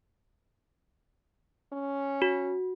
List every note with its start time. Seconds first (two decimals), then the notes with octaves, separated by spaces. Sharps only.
1.73 C#4
2.22 F#4